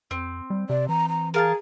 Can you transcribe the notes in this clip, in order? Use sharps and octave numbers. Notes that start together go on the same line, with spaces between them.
F2 C4
G3
C3 D5
E3 A#5
A#5
G#4 A#4 F5 A5